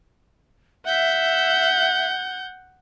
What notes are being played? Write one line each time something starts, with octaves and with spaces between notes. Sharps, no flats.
E5 F#5 G6